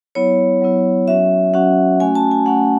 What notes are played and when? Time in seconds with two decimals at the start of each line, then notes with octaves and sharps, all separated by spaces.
0.15 F#3 B3 E4 C#5
0.62 F#3 B3 E4
1.08 F#3 C#4 F#4 E5
1.54 F#3 C#4 F#4 F#5
2.00 A3 C#4 F#4 G#5
2.15 A5
2.31 G#5
2.46 A3 C#4 F#4 F#5